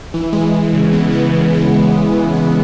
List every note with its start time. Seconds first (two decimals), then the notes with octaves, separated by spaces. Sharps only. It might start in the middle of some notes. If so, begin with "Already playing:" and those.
0.14 E3
0.33 G#3
0.54 G#3
0.73 C#3
0.93 B3
1.13 B3
1.33 C#3
1.53 G#3
1.73 C#3
1.93 B3
2.12 E3
2.33 B3